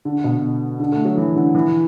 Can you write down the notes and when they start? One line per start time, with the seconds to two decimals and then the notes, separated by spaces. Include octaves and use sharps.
0.05 D3
0.24 B2
0.80 D3
0.92 A3
1.05 F#3
1.17 E3
1.36 D3
1.55 E3